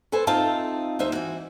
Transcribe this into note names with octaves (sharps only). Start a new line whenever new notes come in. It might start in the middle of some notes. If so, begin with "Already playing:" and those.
A4 B4 C5 G#5
C4 D#4 F4 E5 A5
D#2 D#4 C5 E5
E3 F#4